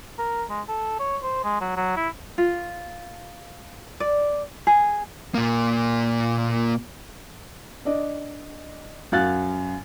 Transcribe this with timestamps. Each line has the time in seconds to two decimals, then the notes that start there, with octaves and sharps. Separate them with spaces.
0.19 A#4
0.50 G#3
0.68 A4
1.00 C#5
1.23 C5
1.44 G#3
1.61 F#3
1.77 F#3
1.97 E4
2.38 F4
4.00 D5
4.67 G#4
5.35 A#2 A#3
7.85 D4 D5 D#5
9.12 F#2 F#4 F5 F#6 A6